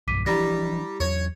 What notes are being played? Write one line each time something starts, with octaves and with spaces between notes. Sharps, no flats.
B1 G2 D6 B6 D#7
E3 F3 G3 D4 E4 A#5 A#6
E2 F#3 C#5